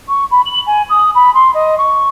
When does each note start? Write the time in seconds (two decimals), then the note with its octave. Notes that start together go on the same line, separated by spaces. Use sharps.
0.08 C#6
0.31 B5
0.45 F#7
0.66 G#5
0.89 D#6
1.14 B5
1.34 C6
1.54 D#5
1.77 C#6